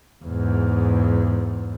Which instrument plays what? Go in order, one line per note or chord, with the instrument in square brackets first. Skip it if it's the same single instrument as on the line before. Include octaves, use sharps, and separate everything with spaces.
[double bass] E2 G#2